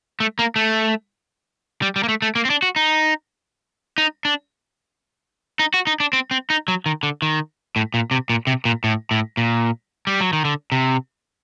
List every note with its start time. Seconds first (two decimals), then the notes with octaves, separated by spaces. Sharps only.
0.20 A3
0.39 A#3
0.56 A3
1.82 G3
1.96 G3
2.03 A#3
2.09 A3
2.22 A3
2.35 A#3
2.45 C4
2.50 D4
2.62 F#4
2.76 D#4
3.98 D#4
4.25 D4
5.59 D#4
5.74 F#4
5.87 D#4
6.00 D4
6.13 C4
6.31 C4
6.50 D#4
6.68 F#3
6.86 D#3
7.03 D3
7.22 D#3
7.76 A2
7.94 A#2
8.11 C3
8.30 A#2
8.47 C3
8.65 A#2
8.84 A2
9.11 A2
9.37 A#2
10.07 G3
10.21 F#3
10.33 D#3
10.45 D3
10.72 C3